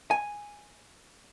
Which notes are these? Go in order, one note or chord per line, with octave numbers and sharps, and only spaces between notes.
G#5